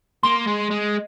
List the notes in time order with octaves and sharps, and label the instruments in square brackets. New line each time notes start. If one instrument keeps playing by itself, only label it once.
[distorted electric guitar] A#3 [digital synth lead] C6
[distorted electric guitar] G#3
G#3